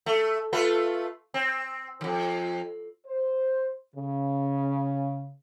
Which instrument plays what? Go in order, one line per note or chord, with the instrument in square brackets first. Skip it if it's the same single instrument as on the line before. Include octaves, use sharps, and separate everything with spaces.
[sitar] A3
A3 F4 B4
C4
F2 E3
[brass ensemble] C5
C#3